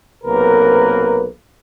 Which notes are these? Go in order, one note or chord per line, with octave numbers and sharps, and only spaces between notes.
B1 C3 A#3 A#4 B4